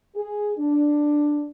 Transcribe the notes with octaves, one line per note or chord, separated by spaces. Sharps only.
G#4
D4